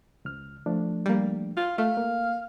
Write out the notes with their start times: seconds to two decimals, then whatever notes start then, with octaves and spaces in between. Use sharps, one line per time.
0.25 C#2 F6
0.66 F3 A3 D4
1.06 G3 A#3
1.57 F4
1.78 A3 F5
1.97 A#3